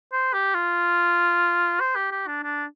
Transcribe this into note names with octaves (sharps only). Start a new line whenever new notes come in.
C5
G4
F4
C5
G4
G4
D4
D4